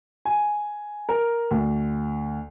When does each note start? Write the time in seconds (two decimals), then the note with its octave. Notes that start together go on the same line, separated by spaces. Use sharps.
0.25 G#5
1.09 A#4
1.51 D2